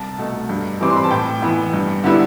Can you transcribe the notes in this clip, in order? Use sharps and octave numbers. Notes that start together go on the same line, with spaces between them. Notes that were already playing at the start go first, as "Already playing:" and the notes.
Already playing: C2 A5
B2 A3
G2
E3 G3 C4 E4 D6
C6
B5
A5
A2 G5
E3 B3
G2
D3 G3 B3 E4